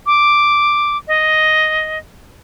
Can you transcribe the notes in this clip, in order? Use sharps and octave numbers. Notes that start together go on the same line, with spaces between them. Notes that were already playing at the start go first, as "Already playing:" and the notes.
D6
D#5